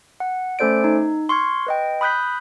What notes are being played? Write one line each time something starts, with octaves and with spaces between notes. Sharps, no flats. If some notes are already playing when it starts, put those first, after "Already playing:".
F#5
A3 C#4 A4 C5 D5 D7
D#4
C6 C#6 F6 G#6
B4 D#5 G5
B5 D#6 F#6 G6 B6